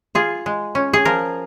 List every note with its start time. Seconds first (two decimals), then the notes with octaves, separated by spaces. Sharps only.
0.15 F4 G#4
0.46 G#3
0.75 C#4
0.93 G#4
1.05 F3 A#4